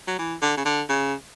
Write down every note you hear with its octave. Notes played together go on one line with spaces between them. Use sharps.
F#3
E3
D3
C#3
D3
C#3